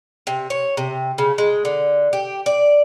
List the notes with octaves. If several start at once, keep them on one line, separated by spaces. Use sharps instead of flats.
C3
C#5
C3
C#3
G#3
D3
G4
D5